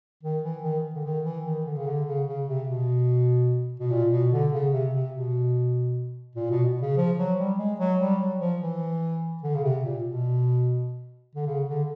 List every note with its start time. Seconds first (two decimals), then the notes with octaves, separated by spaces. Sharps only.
0.23 D#3
0.43 E3
0.63 D#3
0.95 D3
1.05 D#3
1.24 E3
1.45 D#3
1.66 D3
1.76 C#3
1.87 D3
2.06 C#3
2.27 C#3
2.48 C3
2.67 B2
3.80 B2
3.91 A#2
4.11 B2
4.32 D3
4.52 C#3
4.72 C3
4.93 C3
5.14 B2
6.35 A#2
6.51 B2
6.82 C#3
6.97 F3
7.18 F#3
7.38 G3
7.58 G#3
7.79 F#3
8.00 G3
8.20 F#3
8.40 F3
8.61 E3
9.43 D3
9.55 C#3
9.63 C3
9.84 A#2
10.04 B2
11.35 D3
11.47 C#3
11.67 D3